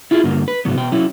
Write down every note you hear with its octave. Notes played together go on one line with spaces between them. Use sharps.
E4 F4 G#4
G2 D3 A#3
B4
G#2 C#3 F#3 B3
B2 G5
F#3 C#4 E4